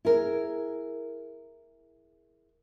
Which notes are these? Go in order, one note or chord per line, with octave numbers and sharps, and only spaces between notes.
E4 G#4 A#4